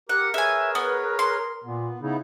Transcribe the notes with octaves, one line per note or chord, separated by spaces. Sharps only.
G4 A#4 F#5
G#4 B4 C#5 E5 G#5
B3
C6
A#2 B3
C#3 B3 D#4 E4